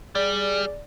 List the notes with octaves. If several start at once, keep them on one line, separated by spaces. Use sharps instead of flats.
G3 G#4 D5